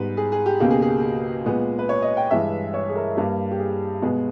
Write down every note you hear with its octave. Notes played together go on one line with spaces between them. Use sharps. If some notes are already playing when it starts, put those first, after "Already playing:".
Already playing: G#2 G3 B3 B4
G#4
G#4
G4
C#2 B2 A#3 G4
G#4
G#4
A#2 G#3 B3
B4
C#5
D#5
G5
G2 E3 G#3 E5
C#5
G#4
A#4
G2 G3 A#3
G4
G#4
B2 G#3 B3